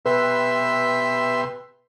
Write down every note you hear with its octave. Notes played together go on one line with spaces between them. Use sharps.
B2 G4 B4 E5 C6 E6